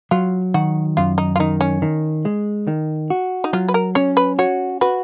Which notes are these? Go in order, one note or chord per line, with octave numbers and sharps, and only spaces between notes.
F#3 F4
D#3 F#4
F#2 F4
D#4
F4
D#3 D#4
C#4
D#3
G#3
D#3
F#4
D#4
F#3 F4
B4
A#4
C#4 C#5
B4
F#4 C#5
F#4 B4